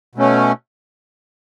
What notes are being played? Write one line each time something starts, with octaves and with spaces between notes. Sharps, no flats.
B2 A3 C#4